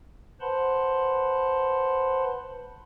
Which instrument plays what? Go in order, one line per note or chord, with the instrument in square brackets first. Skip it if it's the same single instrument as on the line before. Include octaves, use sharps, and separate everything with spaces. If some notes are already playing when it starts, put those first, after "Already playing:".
[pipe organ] B4 C5 F#5 A5 B5 C6